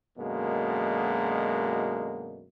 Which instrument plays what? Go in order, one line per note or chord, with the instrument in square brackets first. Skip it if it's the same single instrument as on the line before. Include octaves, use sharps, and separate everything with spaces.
[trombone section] F#2 B2 D3 G#3 A#3